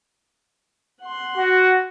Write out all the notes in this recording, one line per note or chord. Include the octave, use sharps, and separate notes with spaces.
F#5 C6
F#4